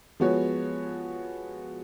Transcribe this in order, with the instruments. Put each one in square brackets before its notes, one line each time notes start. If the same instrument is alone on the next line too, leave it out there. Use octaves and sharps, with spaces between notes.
[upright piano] F3 G#3 B3 F#4 C#5